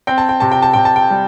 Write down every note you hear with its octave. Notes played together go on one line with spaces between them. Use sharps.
C4 G5
A5
G5
C3 A5
G5
A5
C3 G5
A5
G5
G3